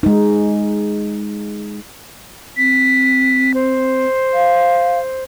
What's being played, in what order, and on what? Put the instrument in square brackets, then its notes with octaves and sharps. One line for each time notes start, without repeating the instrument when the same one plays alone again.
[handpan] G#3 D#4
[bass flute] C4 [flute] B6
[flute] C5
[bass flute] F5